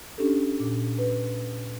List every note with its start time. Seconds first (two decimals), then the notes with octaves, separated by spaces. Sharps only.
0.18 C#4 D4 G4 A4
0.60 A#2
0.98 B4